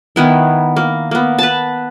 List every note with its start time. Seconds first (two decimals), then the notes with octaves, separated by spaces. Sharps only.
0.16 D#3 B3 E4
0.76 A#3
1.11 A#3 B3
1.39 B4 A5